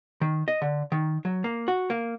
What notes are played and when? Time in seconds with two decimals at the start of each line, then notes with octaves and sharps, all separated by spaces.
0.21 D#3
0.48 D#5
0.62 D3
0.92 D#3
1.25 F#3
1.44 A#3
1.68 F#4
1.90 A#3